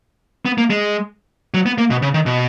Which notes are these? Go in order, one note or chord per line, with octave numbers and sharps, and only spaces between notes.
B3
A#3
G#3
F#3
B3
A#3
B2
C#3
D#3
B2